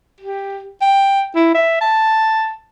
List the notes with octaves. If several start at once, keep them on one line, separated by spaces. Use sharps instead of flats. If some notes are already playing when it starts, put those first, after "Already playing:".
G4
G5
E4
E5
A5